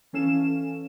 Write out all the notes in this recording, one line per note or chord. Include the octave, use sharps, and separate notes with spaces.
E3 C#4 A4 F5 G#5 E7